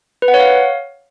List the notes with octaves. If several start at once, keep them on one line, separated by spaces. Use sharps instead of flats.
B4
F#5
C#5
F5